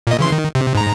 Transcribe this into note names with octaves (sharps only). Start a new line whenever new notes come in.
A#2 D#5
C#3 E3 C6
D#3
C3
G#2 A#5